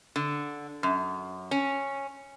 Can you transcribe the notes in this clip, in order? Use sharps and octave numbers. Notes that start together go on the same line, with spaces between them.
D3
F#2
C#4